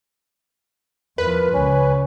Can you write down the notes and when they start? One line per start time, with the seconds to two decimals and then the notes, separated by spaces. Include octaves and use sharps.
1.18 E2 F3 A#4 B4
1.53 C#2 C#3 C#4 G#5